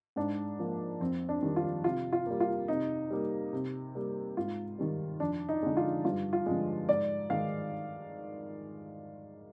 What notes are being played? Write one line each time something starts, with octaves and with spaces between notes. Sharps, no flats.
G#2 D4
F3 A#3
F2 C4
D4
D#3 G3
F4
C3 F4
F4
G3 A#3
F4
C3 D#4
G3 A#3
C3
G3 A#3
G#2 F4
D#3 G3
F2 D4
D#4
D3 G#3
F4
G2 F4
F4
D3 F3 G#3
G#2 D5
D#3 G#3 F5